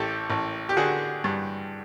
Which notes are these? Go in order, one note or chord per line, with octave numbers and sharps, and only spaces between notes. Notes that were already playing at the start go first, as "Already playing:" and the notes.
Already playing: A1 G4 A4
A1
G4
D3 F#4 G#4
G2